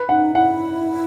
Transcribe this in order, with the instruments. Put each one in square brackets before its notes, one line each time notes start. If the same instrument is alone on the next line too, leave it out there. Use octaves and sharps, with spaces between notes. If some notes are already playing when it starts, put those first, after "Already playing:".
Already playing: [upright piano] B4
[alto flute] D#4 [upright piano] F#5
[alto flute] E4 [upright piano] F#5